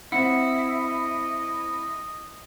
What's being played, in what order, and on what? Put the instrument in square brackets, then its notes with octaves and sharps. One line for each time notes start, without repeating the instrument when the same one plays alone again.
[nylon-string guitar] C4 F#5 [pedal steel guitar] E4 [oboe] D#5 [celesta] C#7